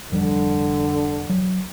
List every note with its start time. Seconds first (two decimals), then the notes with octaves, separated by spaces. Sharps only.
0.12 F1 D3 F3 G3
1.29 F#3